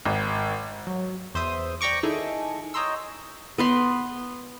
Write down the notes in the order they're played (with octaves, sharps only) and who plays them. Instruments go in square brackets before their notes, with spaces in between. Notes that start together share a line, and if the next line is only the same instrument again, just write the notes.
[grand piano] G#1
[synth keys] F#3
E2 C5 E5 D#6
D5 G5 A#5 C#6 D6
D#3 D#4 E4 G#4 A4
C#5 D#5 G5 A#5 C6 E6
[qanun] B3 B4 C6